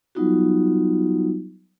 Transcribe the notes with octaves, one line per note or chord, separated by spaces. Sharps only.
F#3 G3 B3 D#4 F4 F#4